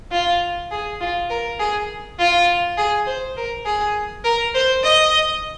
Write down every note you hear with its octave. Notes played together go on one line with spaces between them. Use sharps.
F4
G#4
F4
A#4
G#4
F4
G#4
C5
A#4
G#4
A#4
C5
D#5